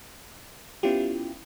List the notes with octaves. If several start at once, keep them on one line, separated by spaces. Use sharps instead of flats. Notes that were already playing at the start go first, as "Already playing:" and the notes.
B3 C#4 E4 F4 G4